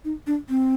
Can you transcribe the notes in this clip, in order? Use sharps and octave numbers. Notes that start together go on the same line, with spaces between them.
D#4
D4
C4